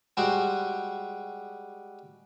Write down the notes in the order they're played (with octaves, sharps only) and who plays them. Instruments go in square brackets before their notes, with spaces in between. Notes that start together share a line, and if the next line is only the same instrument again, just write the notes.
[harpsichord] G3 G#3 F#4 C5